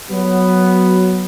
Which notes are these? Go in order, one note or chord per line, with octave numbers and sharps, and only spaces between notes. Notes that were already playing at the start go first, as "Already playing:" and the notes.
F#3 B3